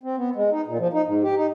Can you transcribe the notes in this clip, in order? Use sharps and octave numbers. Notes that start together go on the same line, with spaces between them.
C4
B3
G#3
D#4
A#2
F3
D#4
G#2
G4
D#4